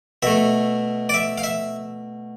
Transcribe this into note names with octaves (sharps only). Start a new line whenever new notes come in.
B2 A3 E5
D5
E5
F5
E5